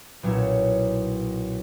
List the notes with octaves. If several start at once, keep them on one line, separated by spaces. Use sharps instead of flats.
B1 A#2 C#4 E4